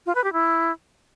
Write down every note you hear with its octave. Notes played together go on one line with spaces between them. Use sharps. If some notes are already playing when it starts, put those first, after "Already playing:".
F4
B4
G4
E4